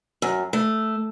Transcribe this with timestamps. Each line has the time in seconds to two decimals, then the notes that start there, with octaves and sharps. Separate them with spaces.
0.22 F#2
0.53 A3